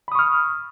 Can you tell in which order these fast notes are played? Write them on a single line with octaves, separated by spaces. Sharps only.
B5 D#6 C#6 F6